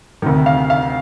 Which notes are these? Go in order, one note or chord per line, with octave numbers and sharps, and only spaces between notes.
D2 C3 D#3
F5
F5